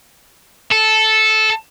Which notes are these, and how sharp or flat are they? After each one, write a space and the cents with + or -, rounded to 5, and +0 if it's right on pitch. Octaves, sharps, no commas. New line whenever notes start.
A4 -10